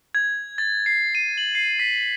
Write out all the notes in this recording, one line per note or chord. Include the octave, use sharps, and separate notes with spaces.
G#6
A6
C7
D#7
F#7
C7
B6